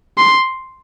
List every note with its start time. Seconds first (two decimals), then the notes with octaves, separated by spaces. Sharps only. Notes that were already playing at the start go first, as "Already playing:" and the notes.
0.18 C6